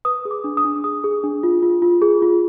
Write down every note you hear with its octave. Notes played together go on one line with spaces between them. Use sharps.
B4 D#6
G#4
D6
D4
D#6
D4
G#4 D#6
G#4
D4
F4
F4
F4
G#4
F4